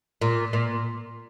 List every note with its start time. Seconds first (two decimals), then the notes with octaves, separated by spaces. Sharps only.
0.21 A#2
0.53 A#2